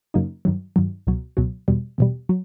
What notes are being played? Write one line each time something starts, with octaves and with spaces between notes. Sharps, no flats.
F#2 C#3 F#3 A#3 D#4
G2 D#3 F#3
G2 D#3 F#3
C#2 B2 F#3
C#2 B2 F#3
E2 B2 G3
E2 B2 G3
F#3